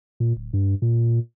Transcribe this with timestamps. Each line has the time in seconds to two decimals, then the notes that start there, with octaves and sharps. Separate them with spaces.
0.20 A#2
0.36 D1
0.53 G2
0.82 A#2